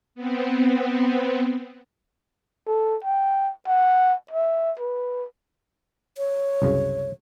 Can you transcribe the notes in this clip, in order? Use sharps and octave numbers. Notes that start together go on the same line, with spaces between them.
B3 C4
A4
G5
F#5
E5
B4
C#5
C2 F#2 C#3